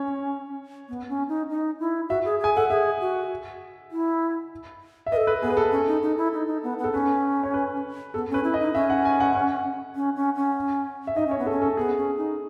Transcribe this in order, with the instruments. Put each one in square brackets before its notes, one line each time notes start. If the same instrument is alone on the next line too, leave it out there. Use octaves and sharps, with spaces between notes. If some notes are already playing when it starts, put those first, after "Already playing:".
Already playing: [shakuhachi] C#4 [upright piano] C#5
[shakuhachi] B3
C#4
D#4
D#4
E4
[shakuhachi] F#4 [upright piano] E5
[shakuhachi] G#4
[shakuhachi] G#4 [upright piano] G#5
[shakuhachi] A4 [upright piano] F#5
[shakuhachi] G#4 [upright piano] E5
[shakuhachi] F#4
E4
[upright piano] E5
[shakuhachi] B4 [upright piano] D#5
[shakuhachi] A4
[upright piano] B4
[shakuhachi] B3 [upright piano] G#4
[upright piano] B4
A4
[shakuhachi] C#4
D#4
D#4
E4
D#4
D#4
B3
B3
[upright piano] A4
[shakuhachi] C#4 [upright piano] B4
[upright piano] C#5
B4
[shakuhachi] B3 [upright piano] A4
[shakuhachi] C#4 [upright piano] B4
[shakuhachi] E4
[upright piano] D#5
[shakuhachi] D#4
[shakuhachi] C#4 [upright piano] E5
[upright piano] F#5
G#5
F#5
F#5
[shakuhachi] C#4
C#4
C#4
[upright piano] E5
[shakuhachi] D#4 [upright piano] D#5
[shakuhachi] C#4 [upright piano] C#5
[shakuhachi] B3
[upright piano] A4
[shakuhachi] C#4
[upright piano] A4
[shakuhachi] B3 [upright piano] G#4
[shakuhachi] C#4
D#4